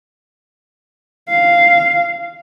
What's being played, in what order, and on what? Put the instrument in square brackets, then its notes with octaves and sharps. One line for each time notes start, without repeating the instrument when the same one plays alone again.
[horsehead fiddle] F5